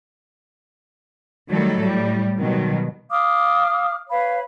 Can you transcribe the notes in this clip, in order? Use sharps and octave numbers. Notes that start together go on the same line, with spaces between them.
D#3 F#3 G3 A3 A4
A2 G3
B2 D#3 F#3 G3
F5 D6 D#6 F6
B4 C#5 F5 B5